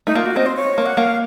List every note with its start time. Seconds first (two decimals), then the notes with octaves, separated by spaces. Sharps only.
0.07 A3 D#4
0.15 A#3 F4
0.26 F#4
0.36 C4 D#5
0.46 C5
0.56 C#5
0.78 A#3
0.86 F#5
0.97 A#3 F5